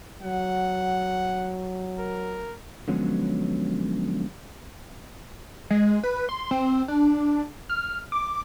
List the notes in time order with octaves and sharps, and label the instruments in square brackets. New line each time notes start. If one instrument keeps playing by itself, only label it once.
[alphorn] F#3 [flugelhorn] F#5
[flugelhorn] A#4
[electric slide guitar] D3 F3 F#3 G#3 B3 C#4
[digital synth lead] G#3
B4
C6
C4
D4
F6
D6